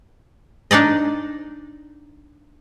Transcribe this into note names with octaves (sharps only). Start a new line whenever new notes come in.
D4 D#4 D5 D#5